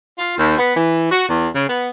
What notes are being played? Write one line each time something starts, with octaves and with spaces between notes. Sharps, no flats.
F4
D#2
B3
E3
F#4
E2
C#3
B3